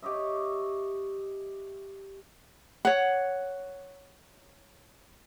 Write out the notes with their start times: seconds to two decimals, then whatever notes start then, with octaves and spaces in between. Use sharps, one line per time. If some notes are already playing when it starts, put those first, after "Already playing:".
0.02 G4 C#5 D#5 E5
2.85 C#5 F#5